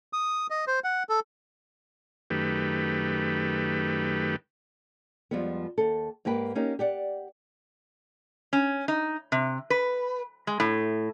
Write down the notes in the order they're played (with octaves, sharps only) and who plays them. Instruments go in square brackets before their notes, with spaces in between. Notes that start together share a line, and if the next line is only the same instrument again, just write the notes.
[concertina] D#6
D#5
C5
F#5
A4
[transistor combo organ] F#2 D#3 A3 G4 B4
[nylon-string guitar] F2 F3 G3 G#3 B3
D#2 A4
G#2 A#3 G4 B4 G5
A#3 C#4 D#4 G4
G4 D5 F#5
[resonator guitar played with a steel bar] C#4
D#4
C3
B4
G#3
A2